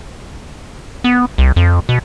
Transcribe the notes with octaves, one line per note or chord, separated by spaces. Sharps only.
B3
C2
F2
B2